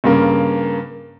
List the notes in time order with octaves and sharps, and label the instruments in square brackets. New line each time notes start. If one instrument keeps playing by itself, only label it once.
[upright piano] G2 C#3 A#3